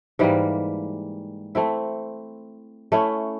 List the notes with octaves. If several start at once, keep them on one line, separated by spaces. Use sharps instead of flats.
G#2 E3 G3 A#3
A3 C4 E4
A3 C#4 E4